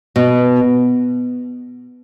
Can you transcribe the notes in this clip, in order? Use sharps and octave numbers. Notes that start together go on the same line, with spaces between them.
B2